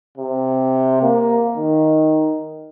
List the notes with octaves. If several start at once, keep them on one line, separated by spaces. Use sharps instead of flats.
C3
A#3
D#3